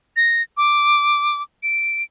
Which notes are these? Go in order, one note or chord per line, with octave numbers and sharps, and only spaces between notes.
A#6
D6
D7